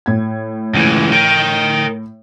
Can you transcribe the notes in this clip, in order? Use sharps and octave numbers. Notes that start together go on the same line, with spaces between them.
A2 G#6
C#2 E3
A#4 G5